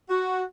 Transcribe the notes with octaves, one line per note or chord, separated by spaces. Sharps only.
F#4